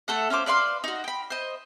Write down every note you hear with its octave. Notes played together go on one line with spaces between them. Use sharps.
A3 A4 F#5
C#4 F4 C5 D6
B4 D5 F5 C6
D#4 F#4
G5 B5
C5 D#5